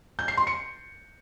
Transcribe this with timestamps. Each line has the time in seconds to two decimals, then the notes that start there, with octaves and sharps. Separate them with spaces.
0.19 G6
0.28 C7
0.37 C6
0.47 C#7